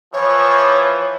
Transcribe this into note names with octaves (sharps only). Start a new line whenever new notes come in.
E3 F3 C#5